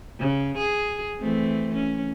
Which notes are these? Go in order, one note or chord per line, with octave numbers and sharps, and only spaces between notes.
C#3
G#4
E3 A3 C4
C#4